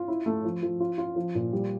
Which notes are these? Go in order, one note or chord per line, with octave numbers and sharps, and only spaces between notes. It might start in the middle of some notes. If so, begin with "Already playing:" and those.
Already playing: F4
E4
A3
F3
F3
F4
F4
F3
A#2
G3